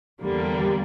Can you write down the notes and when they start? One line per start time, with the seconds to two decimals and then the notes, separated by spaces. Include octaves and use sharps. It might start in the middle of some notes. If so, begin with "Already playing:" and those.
0.22 E2 D3 G3 A#3